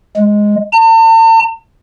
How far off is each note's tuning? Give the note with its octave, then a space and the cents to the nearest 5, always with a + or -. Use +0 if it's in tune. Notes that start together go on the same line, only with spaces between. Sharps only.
G#3 +0
A5 +45